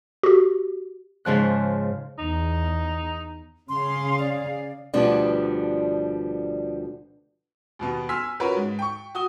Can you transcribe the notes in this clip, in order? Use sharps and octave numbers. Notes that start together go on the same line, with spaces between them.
F#4 G4
G#2 C#3 F3 F#6
E2 D#4
C#3 G#4 F5 C6
D5
D2 B2 F3 G3 B3 D4
D#2 B2 B3
G#5 C6 E6 F6 B6
C#4 F4 F#4 A#4 B4 C#5
G#2
G5 C#6
F#4 D#6 G7